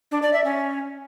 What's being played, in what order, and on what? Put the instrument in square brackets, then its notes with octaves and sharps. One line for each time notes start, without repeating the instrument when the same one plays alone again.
[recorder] D4
D5
E5
C#4